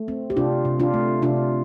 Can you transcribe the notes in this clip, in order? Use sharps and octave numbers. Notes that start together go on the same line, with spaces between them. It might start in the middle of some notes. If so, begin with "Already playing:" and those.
Already playing: A3
C4
G4
C3 D4 F4
C3
D4 F4
A3
C3 D4 F4